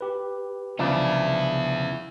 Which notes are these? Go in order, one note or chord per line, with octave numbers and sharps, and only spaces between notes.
G4 B4
C2 C#3 F3 B3 D4 E4 F5 D6